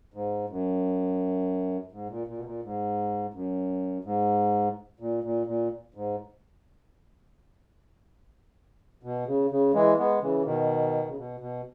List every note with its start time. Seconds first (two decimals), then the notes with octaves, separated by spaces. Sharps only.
0.14 G#2
0.49 F#2
1.92 G#2
2.09 A#2
2.27 A#2
2.37 B2
2.45 A#2
2.63 G#2
3.34 F#2
4.05 G#2
5.00 A#2
5.24 A#2
5.47 A#2
5.94 G#2
9.03 B2
9.27 C#3
9.51 C#3
9.74 E3 G#3
9.98 G#3 B3
10.21 C#3 E3
10.45 B2 D#3
11.07 C#3
11.17 B2
11.40 B2